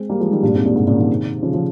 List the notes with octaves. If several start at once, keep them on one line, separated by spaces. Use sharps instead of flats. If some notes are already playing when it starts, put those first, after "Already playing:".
Already playing: G#3 C4
G3 A#3
F3 G#3
D#3 G3
G2 A#2
F2 G#2
G2 A#2
G#2 C3
A#2 C#3
C3 D#3
C#3 F3
C#3 F3